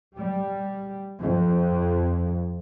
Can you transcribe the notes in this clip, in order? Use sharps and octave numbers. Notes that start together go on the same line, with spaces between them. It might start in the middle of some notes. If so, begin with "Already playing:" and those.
G3
F2